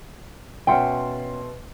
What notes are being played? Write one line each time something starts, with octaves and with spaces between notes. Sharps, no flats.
B2 C#4 E5 F#5 G5 C6